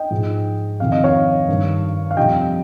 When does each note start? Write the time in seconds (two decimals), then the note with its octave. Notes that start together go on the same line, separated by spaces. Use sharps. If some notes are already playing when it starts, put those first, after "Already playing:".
Already playing: D#5 G5
0.11 G#2 F3 G#3
0.80 F2 C3 D#3 F5
0.92 D#5
1.04 C#5 F5
1.48 G2 D#3 G3
2.11 F5
2.17 F2 C3 G3 D#5 G5